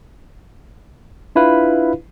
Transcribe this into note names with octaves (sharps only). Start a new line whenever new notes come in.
D4 E4 F4 B4 F5